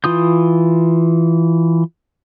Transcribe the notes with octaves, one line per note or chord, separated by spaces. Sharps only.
E3 F4 D#6 G6